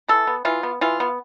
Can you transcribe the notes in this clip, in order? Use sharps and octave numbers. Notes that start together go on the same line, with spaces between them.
E3 A4
B3
E3 F4
B3
E3 F4
B3